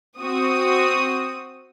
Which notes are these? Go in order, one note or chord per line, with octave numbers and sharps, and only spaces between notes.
C4 F#4 D#6